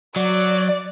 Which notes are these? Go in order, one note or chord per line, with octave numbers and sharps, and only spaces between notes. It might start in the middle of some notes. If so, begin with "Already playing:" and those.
F#3 D5